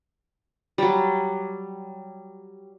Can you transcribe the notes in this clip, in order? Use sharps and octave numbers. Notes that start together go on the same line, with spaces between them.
F#3 G3